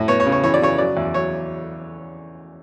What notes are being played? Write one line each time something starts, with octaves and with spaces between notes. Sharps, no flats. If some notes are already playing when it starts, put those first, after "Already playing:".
Already playing: A2
B3 C#5
C#5
C#3
C#5
E3 C#5
D5
C#3 C#5
F#3 D5
E2
F#3 C#5